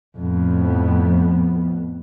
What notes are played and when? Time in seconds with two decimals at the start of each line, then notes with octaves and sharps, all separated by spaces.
0.18 F2 A2 B3